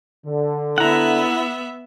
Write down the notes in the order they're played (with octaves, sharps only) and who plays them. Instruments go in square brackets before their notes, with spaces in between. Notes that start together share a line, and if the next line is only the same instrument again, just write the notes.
[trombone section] D3
[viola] B3 E5 [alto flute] E4 [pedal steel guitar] F#5 A#5